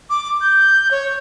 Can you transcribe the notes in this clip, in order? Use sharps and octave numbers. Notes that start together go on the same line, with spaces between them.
D6
G6
C#5